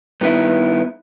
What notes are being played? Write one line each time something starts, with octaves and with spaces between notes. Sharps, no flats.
G2 D#3 B3 E4